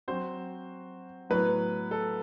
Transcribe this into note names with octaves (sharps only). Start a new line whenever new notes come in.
F#3 C4 F#4 C5
A2 F#3 B3 B4
A4